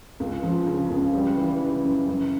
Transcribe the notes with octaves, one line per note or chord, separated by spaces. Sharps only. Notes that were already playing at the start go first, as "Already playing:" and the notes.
C#2
F3
C#3
C#2
G3
E3
C#3
F#2
F#2